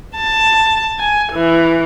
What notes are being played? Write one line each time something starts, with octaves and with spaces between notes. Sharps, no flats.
A5
G#5
E3